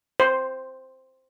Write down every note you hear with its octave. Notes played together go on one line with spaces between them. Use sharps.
C5